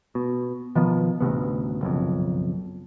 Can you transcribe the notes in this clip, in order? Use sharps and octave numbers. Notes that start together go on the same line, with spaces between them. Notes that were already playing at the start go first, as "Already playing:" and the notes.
B2
B2 D#3 F3 B3
A1 D2 C3 B3
F#1 B1 F2